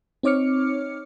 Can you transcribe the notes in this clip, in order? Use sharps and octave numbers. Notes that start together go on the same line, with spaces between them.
C4 D#4 C#5 D6 F6 C#7